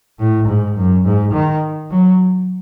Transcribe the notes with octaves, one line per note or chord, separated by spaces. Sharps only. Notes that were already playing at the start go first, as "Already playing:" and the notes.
A2
G#2
F#2
G#2
D#3
F#3